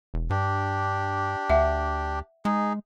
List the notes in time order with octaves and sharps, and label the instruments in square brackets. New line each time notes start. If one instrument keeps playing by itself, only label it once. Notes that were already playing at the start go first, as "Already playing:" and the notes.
[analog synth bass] E1
[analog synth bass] G2 [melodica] D4 G4
[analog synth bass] D2 [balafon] E5 F#5
[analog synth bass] G#3 [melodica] D#4 G#4